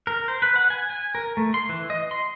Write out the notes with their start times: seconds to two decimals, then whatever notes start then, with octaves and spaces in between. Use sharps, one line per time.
0.07 A#4
0.28 C5
0.42 B4
0.56 F#5
0.70 G#5
0.90 G#5
1.15 A#4
1.37 A3
1.54 C6
1.69 E3
1.90 D#5
2.11 C6